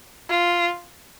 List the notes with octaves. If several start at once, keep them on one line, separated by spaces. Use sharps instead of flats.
F4